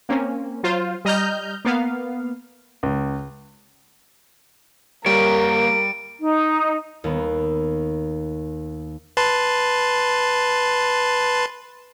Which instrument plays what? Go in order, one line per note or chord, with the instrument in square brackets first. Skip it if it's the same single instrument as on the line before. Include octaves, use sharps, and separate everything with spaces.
[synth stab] A#3 C4 C#4
F#3 F4 C5
G3 D#5 A#5 F6 G6
A#3 B3 F5
[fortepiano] C#2
[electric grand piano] G3 [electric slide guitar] A#3 C#5 [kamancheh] A#4 [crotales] D7
[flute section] D#4
[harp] D#2 B3
[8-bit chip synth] B4 A5 C6